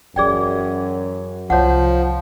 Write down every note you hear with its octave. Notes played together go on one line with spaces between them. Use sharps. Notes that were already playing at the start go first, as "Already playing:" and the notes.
F#2 E3 F#3 G#4 D5 G5
C2 F3 C#5 F#5